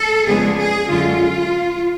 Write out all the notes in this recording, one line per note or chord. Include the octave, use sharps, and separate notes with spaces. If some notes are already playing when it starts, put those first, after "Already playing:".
Already playing: A4
F2 C#3 G#3 B3 D4 G#4
G#4
F#2 D3 G#3 C#4 F4